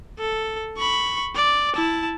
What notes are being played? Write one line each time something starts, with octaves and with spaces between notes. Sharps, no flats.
A4
B5 C#6
D5
E4 A5